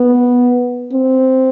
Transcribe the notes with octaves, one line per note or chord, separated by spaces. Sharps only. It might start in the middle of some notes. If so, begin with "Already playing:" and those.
Already playing: B3
C4